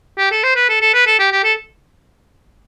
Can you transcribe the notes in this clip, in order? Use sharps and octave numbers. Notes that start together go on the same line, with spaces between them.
G4
A4
C5
B4
A4
A4
B4
A4
G4
G4
A4